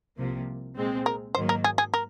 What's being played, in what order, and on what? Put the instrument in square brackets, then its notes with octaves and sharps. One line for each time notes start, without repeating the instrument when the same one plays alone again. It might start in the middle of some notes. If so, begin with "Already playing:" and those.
[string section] C2 C3 F3 A#3
A#2 G#3 C4
[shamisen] A#4
[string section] G#2 D#3 F#3 A#3 [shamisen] C5
[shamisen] A#4
G#4
G#4
A#4